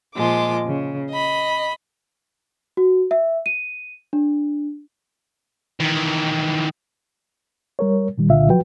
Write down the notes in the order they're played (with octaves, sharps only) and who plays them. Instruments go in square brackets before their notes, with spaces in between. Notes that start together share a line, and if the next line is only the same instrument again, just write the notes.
[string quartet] A#2 F3 G#3 D6
C#3
D#5 B5
[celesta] F#4
E5
D#7
D4
[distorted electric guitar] D#3 E3
[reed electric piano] G3 A#4 C#5
A#2 D#3 G3
C2 A#2 D3 F4 E5 F5
F3 F#3 F#4 B4 G5